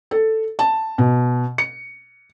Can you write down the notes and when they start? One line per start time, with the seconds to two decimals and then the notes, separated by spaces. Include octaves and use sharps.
0.11 A4
0.59 A5
0.98 B2
1.58 C#7